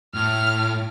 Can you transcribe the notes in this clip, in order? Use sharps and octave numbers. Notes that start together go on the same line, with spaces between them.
A2 F6